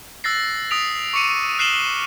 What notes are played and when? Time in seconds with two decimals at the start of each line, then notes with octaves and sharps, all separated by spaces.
0.24 E6 F#6 A6 A#6 C7
0.71 D#6 A6 B6 D7 F7
1.13 C#6 D6 C#7 D#7
1.59 F6 F#6 C7 E7 F#7 G7